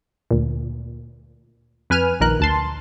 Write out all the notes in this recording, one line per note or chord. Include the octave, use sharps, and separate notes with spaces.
D2 A#2
F2 B4 G#5 F6 D#7
A#1 A#2 D#3 A#4 F#6
D2 A5 C6